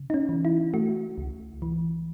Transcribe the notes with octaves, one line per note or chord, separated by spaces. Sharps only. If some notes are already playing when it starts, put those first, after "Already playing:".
Already playing: C#3
D#4
C#4
E3
E4
A3 F#4
C#2
E3